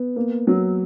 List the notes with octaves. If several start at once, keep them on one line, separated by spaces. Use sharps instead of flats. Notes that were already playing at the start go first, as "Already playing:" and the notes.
Already playing: B3
A#3
F#3